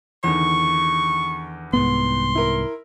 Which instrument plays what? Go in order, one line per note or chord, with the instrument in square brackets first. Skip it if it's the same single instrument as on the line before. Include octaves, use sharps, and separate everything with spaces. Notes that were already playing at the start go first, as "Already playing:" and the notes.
[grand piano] E2 D3 D#3 [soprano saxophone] C#6
[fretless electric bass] C2 G#2 B3 [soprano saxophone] C6
[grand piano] E4 A#4